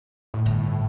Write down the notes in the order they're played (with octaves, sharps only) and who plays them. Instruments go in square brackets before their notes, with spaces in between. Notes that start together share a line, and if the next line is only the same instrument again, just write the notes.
[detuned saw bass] A2
[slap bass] G1